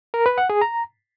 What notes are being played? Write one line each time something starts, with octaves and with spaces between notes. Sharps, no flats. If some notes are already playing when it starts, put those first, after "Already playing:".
A#4
B4
F#5
G#4
A#5